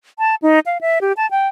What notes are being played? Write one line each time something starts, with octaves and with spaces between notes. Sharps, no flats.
A5
D#4
F5
E5
G4
A5
G5